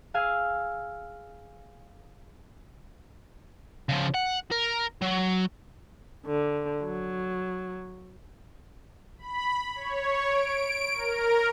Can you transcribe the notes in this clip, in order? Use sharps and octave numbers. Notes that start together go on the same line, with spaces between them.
G#4 F5 G#5 E6
C#3 F3
F#5
A#4
F#3
D3
F#3
B5
C#5
D7
A#4